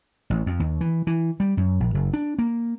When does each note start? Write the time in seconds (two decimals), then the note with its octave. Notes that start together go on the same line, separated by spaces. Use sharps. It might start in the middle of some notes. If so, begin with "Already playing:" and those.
0.30 A1
0.46 F2
0.60 D#2
0.81 E3
1.07 E3
1.40 G3
1.57 F#2
1.80 A#1
1.94 F#1
2.13 D4
2.39 A#3